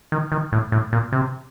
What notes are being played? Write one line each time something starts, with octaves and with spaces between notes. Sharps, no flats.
D#3
D#3
A2
A2
A#2
C3